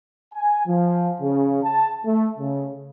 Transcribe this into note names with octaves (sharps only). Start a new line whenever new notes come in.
G#5
F3
C#3
A5
A3
C#3